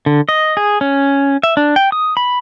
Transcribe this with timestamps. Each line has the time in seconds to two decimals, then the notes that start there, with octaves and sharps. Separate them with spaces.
0.06 D3
0.29 D#5
0.57 G#4
0.81 C#4
1.43 E5
1.57 D4
1.76 G5
1.92 D#6
2.17 B5